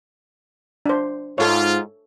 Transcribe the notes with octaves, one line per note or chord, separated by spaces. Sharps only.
D4 C5
G#2 F4 A4 C#5